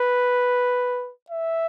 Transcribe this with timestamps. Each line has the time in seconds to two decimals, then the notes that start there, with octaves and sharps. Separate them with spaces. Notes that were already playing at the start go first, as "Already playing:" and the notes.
Already playing: B4
1.30 E5